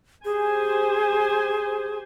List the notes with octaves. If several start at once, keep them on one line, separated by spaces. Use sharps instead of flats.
G4 G#4 C5 G#5